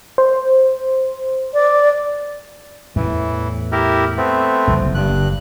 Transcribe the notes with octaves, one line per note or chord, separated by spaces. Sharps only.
C5
D5
E2 A2 E3
E4 G4 A#4
A3 B3 C4
F#1 C2 F2
F#1 G2 D3 F#6